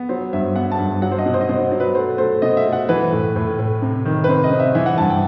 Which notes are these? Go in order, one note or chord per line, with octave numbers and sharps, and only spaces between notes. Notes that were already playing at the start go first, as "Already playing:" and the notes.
Already playing: B3
F#3 C5
G2 E5
B3 F#5
A5
G2
F#3 F#5
C5
D#5
B2
C5
D#5
B2 C5
F#3
B4
A3 C5
A3 C5
B2 D#5
E5
A3
F#5
E3 B4
A2
A2
A2
C3
D#3
B4
C3 C5
D#5
C3
E5
E3 E5
F#5
G2 A5
G5